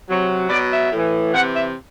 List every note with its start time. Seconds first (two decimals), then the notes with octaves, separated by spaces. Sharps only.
0.08 C3 F#3
0.49 B2 F#3 D5
0.71 E5
0.92 A2 E3
1.33 C3 E3 F#5
1.55 E5